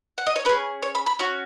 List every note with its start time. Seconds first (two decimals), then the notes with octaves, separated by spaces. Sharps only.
0.18 F#5
0.27 D#5
0.36 C#5
0.45 C#4 G#4 B4
0.82 C#5
0.95 B5
1.06 B5
1.19 C#4 F#4 C#6